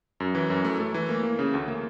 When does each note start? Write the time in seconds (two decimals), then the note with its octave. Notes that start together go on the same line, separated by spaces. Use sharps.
0.20 F#2
0.35 E3
0.50 F#2
0.65 A3
0.80 A3
0.94 E3
1.09 A#3
1.23 A#3
1.39 C#3
1.54 D2
1.68 A#3